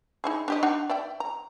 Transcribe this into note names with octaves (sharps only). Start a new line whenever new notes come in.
D#4 E4 G#4
D4 G4 D#5
D4 D#4 F#5
D5 E5 G5
A#5